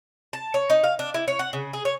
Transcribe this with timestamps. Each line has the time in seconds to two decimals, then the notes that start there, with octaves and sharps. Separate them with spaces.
0.33 A5
0.54 C#5
0.70 D#4
0.84 F5
0.99 D4
1.14 E4
1.28 C#5
1.39 F#5
1.53 C#3
1.73 G#4
1.85 C#5